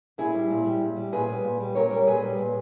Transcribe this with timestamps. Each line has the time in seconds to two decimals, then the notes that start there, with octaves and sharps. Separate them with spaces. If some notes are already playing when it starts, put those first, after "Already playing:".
0.18 A#2 E4 G#4
0.35 G3
0.50 A#2
0.65 G3
0.81 A#2
0.96 G3
1.12 A#2 G#4 B4
1.28 G3
1.44 A#2
1.60 G3
1.75 A#2 A#4 C#5
1.91 G3
2.07 A#2 G#4 B4
2.23 G3
2.38 A#2